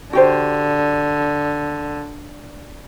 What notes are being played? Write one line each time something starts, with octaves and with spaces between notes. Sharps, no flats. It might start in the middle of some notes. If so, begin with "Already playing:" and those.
D3 F#4 G4 C5